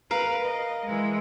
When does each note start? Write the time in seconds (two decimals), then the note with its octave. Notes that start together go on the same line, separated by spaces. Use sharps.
0.11 A#4 B4 F5
0.44 D#5
0.85 E3 G#3